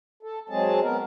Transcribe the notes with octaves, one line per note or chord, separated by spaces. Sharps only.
A4
F#3 G#3 C4 G#4 A5
B3 A#4